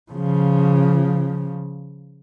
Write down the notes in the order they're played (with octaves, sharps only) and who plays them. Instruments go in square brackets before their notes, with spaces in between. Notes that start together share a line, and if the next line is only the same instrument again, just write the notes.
[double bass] C#3 F3